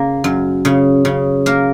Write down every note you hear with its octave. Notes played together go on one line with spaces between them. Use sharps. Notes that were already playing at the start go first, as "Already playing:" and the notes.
Already playing: C#3 A#3
F#2
C#3
C#3
A#3 A#4